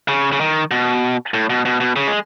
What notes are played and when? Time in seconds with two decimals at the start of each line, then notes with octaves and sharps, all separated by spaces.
0.08 C#3
0.33 C#3
0.41 D#3
0.71 B2
1.34 A2
1.50 B2
1.65 B2
1.80 B2
1.96 C#3
2.07 G#3